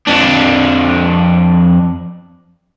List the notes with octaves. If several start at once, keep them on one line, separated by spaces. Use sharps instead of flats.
F2 D4